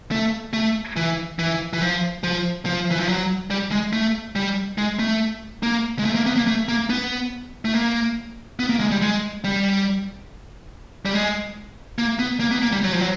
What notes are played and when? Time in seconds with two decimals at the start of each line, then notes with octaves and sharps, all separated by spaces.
0.11 A3
0.53 A3
0.96 E3
1.39 E3
1.73 E3
1.81 F3
2.24 F3
2.66 F3
2.91 E3
3.00 F3
3.09 F#3
3.50 G3
3.72 G#3
3.93 A3
4.36 G3
4.78 G#3
4.99 A3
5.63 A#3
5.99 G#3
6.05 A3
6.15 A#3
6.26 B3
6.36 A#3
6.47 A3
6.68 A#3
6.90 B3
7.65 A3
7.74 A#3
8.59 B3
8.69 A#3
8.80 G#3
8.91 G3
9.02 G#3
9.44 G3
11.05 G3
11.14 G#3
11.98 A#3
12.19 B3
12.40 A#3
12.51 B3
12.62 A#3
12.72 G3
12.84 F#3
12.92 F3
13.00 F#3